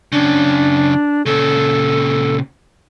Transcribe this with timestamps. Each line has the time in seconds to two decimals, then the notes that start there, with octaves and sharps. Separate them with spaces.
0.12 F#2 C#3 D4
1.26 A#2 C#3 A4